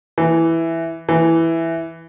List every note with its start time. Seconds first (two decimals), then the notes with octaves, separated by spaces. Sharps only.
0.18 E3
1.09 E3